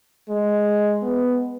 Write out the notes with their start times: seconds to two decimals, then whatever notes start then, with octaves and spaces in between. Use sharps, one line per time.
0.29 G#3
1.03 B3